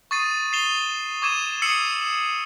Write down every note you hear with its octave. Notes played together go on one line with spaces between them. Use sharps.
C#6 D#6 A6 C7 D#7
A6 C7 E7 F7 G7
C#6 D6 G#6 D#7 E7
D#6 E6 C7 C#7 F#7